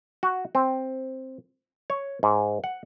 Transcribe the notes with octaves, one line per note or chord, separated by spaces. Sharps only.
F#4
C4
C#5
G#2
F#5